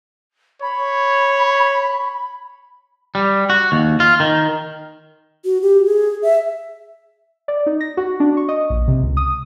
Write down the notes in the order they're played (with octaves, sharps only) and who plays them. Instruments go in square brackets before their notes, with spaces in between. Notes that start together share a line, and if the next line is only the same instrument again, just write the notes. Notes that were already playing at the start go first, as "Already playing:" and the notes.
[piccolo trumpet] C#5 [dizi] B5
[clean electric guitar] G3
F#4
D#2
F4
D#3
[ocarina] F#4
G4
G#4
E5
[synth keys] D5
D#4
A#6
F#4
D4
C#6
D#5
A#1
C3
C#2
D#6